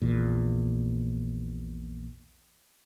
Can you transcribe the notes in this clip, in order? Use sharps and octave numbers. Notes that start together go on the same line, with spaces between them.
A#1 E2 A#2